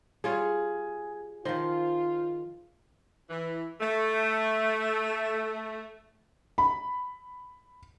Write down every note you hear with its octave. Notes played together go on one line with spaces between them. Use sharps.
G3 F4 G#4 C#5
D#3 F3 F4 C5
E3
A3
B5